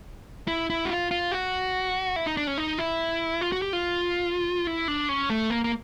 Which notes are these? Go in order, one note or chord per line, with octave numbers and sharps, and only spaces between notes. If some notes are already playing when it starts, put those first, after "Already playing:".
E4
E4
F#4
F4
F4
F#4
E4
D#4
D4
C#4
D#4
E4
F4
F#4
G4
F4
E4
D4
C#4
A3
A#3
A#3